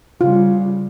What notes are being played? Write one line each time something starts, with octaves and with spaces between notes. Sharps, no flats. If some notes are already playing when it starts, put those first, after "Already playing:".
C#3 G3 F4